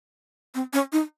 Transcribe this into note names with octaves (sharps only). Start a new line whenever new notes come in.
C4
C#4
D#4